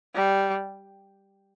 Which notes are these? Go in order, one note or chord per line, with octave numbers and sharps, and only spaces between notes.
G3